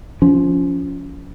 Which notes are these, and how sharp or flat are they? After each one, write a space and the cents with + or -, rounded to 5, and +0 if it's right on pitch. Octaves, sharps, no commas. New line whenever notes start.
F3 +0 C#4 +20